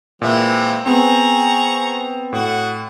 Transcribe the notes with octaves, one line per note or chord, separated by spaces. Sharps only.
A#2 E3 G#3 C4 E5
B3 C4 G#4 A#5 C#6
A2 F#4